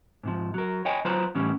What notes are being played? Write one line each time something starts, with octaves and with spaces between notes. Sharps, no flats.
G#2 C3 F3
F#3 A#4
C#5 D#5 G5 G#5
F#3 F4 B4 C5 A#5
A2 E3 G3 C#4